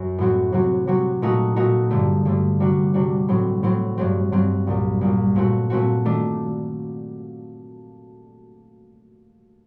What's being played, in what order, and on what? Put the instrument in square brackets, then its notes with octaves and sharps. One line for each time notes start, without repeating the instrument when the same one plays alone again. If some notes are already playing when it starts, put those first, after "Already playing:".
Already playing: [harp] F#2
A2 F#3 C4 F#4
C3 F#3 C4 F#4
C3 F#3 C4 F#4
A#2 A3 D#4 F#4
A#2 A3 D#4 F#4
G2 D3 A3
G2 D3 A3
C3 G3 D4 F#4
C3 G3 D4 F#4
A2 F#3 C4
A2 F#3 C4
G2 F#3 C4
G2 F#3 C4
C2 A#2 G3
C2 A#2 G3
A#2 A3 C4 F#4
A#2 A3 C4 F#4
D#3 A3 D4